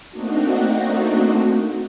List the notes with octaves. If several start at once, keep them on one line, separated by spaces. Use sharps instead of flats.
A3 A#3 C4 D4 D#4 F#4